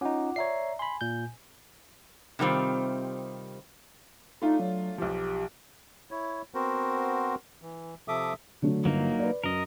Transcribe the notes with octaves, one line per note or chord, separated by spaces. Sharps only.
C#4 D#4 F4 F#5 D6
C#5 D5 E5 A#5 C7
G#5 B5 C6
A#2 G6
C3 D#3 G3 C4 F4
A3 D4 D#4 F4
F#3
B1 F3 G4
E4 C#5
B3 C4 F#4 A#4 C5
E3
C3 F3 A4 E5 D6 D#6
D3 F#3 A3
G1 F#3 A#3 D#4
B4 D5
F#2 A#4 D#5